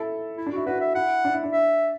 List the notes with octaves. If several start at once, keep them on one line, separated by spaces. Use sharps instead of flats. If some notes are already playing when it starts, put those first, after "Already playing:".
Already playing: E4 A4
E4
D4
E4 F#4
D4 F#4 B4
E5
E4 F#5
D4
E4
D4
E5